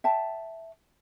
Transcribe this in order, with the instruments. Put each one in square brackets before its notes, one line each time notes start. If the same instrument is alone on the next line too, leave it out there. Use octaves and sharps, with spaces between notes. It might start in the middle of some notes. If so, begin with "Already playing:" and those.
[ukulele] E5 G5 A5